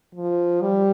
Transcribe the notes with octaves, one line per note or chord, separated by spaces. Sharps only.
F3
G3